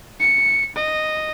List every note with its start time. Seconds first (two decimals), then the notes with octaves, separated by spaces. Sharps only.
0.20 C#7
0.76 D#5